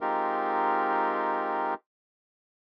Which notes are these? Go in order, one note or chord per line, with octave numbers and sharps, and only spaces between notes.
G#3 C4 D#4 F4 G4 A#4